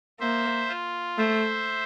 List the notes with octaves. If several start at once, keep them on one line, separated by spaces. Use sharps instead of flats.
A#3 C5 E5
F4
A3 C5 E5